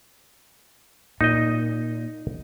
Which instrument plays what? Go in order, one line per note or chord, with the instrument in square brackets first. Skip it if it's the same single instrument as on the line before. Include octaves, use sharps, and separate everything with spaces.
[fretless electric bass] A#2 [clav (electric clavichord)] D#4 D#5